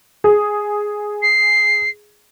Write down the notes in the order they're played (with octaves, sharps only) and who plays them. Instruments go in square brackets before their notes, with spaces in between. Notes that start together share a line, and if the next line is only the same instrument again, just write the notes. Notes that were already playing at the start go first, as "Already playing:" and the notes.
[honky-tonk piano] G#4
[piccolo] C7